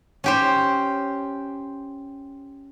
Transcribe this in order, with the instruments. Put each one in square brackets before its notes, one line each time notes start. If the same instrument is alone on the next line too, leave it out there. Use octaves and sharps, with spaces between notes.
[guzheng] C#4 G4 C5